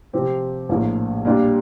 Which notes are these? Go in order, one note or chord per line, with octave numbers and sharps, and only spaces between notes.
C3 F3 C4 G4
A#1 A2 F3 A#3
A#2 G3 D4 F4